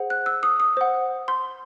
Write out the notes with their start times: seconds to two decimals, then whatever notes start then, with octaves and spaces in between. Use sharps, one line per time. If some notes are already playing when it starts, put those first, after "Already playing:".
Already playing: G#4 C5 F#5
0.10 F#6
0.26 E6
0.43 D#6
0.60 D#6
0.77 C5 F#5
1.28 C6